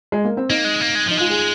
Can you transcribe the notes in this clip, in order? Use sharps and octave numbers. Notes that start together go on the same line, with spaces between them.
G#3
A#3
C4
A#3 D#4
G#3
A#3
G#3
F3 D#4
G#3 F4
G#4